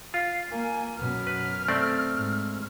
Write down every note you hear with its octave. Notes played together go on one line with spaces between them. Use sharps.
F4 F5
A#3 G#5
F#2 B2 F6
B4
A3 C4 D5
G#2